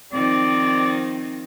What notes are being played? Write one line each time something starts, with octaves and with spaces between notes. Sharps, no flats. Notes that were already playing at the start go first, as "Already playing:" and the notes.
D#3 F3 C4 D#4 D5